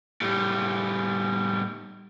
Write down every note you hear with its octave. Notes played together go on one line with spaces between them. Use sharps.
A2 G3